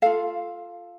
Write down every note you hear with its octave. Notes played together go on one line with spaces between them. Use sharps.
F4 A4 F5